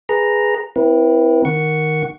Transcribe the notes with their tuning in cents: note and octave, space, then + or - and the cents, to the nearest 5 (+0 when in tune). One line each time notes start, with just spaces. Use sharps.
G#4 +0 B4 +0 A#5 +0
C4 +0 E4 +0 B4 -45
D#3 +0 F#5 +0 C#6 +0